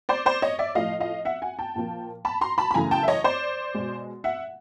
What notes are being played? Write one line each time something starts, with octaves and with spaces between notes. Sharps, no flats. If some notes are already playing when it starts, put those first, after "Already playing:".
C5 D5
C5 D5
C#5 D#5
D5 E5
A2 F3 A3 D#5 F5
D#5 F5
E5 F#5
F#5 G#5
G5 A5
A#2 F3 A#3
A5 B5
A#5 C6
A5 B5
B5
F#2 C#3 E3 A3 G#5 A#5
G5 A5
E5
C#5 D#5
C5 D5
B2 G#3
E5 F#5